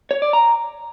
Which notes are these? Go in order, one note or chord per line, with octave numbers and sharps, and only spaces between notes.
C#5
D5
A#5